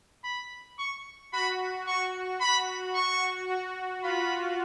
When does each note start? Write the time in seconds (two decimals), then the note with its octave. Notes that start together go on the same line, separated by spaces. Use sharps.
0.24 B5
0.79 C#6
1.33 F#4 B5
1.87 F#4 C#6
2.41 B5
2.95 C#6
3.49 F#4
4.03 F4 B5